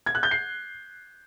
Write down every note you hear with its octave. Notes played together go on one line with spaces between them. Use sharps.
G#6
F#6
G6
C7